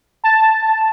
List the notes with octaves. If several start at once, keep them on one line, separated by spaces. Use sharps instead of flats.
A5